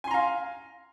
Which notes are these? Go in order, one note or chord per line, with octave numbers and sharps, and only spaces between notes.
F5 G#5 A#5 C6